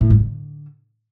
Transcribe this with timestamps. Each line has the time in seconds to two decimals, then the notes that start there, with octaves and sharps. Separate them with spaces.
0.01 A2
0.10 G2
0.20 D3